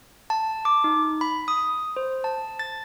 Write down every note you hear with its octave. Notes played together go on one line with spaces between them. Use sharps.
A5
D6
D#4
B5
D#6
C5
A5
A6